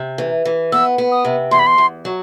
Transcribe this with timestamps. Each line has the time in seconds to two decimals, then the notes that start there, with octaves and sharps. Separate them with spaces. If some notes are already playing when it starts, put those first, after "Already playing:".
Already playing: C3
0.18 E3
0.45 E3
0.72 B3 E6
0.98 B3
1.12 D#6
1.25 C3
1.51 E2 C6
1.59 B5
1.67 C6
1.78 E2
2.05 F#3